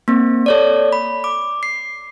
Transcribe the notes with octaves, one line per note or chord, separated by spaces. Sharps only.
A#3 C4
A4 C#5 D5
B5
D6
C7